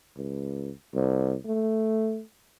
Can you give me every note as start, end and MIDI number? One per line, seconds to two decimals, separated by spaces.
0.16 0.72 37
0.94 1.35 36
1.46 2.21 57